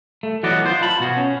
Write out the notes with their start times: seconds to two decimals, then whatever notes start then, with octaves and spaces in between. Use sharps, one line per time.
0.23 A3
0.43 E3 F#3 B3 F#4 D5 D#5
0.66 F4 C5
0.81 F5 A5 B5
1.00 B2 F#4 G#4
1.17 C#4